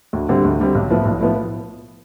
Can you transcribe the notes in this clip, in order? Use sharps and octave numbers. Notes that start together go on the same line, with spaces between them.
D2
D3 G3 C4
D2
D3 G3 C4
B1
A2 F3 B3 E4
B1
A2 F3 B3 E4